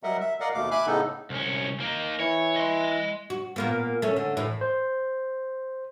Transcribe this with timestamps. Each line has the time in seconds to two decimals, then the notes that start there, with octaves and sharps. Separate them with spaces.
0.03 F#3 G3 A#4 D#5 E5 F#5
0.20 E5
0.40 A#4 D5 D#5 F5 F#5
0.54 D#2 B2 A3 F5 D6
0.71 E5 G#5 B5 D6 F#6
0.87 A2 C#3 B3 D#4 A4
1.30 C2 C#4
1.80 A#3 D#4
2.20 E3 C#5
2.56 D#5 C6
3.30 F#4
3.56 A#2 A#3 B3
4.02 A3 C#4
4.17 D3
4.37 A2 E3
4.61 C5